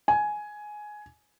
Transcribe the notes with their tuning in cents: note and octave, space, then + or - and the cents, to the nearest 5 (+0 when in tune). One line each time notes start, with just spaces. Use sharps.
G#5 +10